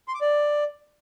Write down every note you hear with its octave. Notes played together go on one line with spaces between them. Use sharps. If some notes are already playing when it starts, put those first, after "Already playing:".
C6
D6
D5